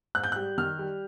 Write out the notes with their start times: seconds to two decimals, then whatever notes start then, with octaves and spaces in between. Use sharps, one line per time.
0.15 G#2 F#6
0.24 G6
0.32 G3 F#6
0.58 D#3 F6
0.79 G3